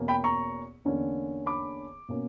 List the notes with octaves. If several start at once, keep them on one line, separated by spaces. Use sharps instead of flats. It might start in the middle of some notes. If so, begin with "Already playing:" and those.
Already playing: E2 B2 A#3 C#4
G5 B5
A#5 C#6
E2 D3 A#3 C#4
B5 D6
B2 A#3 C#4